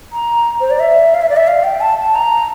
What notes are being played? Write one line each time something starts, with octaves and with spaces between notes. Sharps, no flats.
A#5
C5
D5
E5
F5
E5
D5
E5
F5
G5
A5
A5
A#5